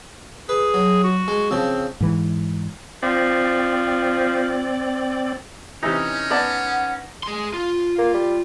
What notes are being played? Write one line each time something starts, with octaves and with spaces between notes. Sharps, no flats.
G#4 B4
F#3
F#4
G#3
C#3 F3 C4
G#2 E3
F3 C4 D5
C3 E3 C#4 D#4
B3 D5 F#5 A5
G#4 C6
F4
A#3
G3